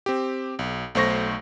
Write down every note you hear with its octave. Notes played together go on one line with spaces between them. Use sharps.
C4 G4
B1
B1 A3 C5 C#6 A#6